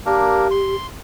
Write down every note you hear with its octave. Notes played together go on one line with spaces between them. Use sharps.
A#3 D4 G4 A#4
C6